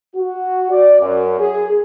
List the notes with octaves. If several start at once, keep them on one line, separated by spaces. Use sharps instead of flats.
F#4
D5
F#2
G#4